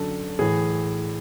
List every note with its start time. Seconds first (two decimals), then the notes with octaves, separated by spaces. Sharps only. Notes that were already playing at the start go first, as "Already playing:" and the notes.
Already playing: F#2 D3 A4
0.39 A2 E3 G#4